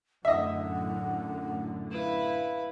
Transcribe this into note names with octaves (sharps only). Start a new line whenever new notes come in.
F#2 A2 D3 D#5 E5 F#5
E4 B4 F5